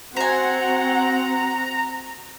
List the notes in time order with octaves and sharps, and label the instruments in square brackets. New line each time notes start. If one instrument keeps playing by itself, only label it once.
[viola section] C4 F#4 F#5 [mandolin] C5 G#5 [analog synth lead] A#5